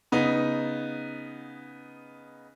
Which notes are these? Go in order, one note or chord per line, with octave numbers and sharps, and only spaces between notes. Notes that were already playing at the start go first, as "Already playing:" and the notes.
C#3 B3 D#4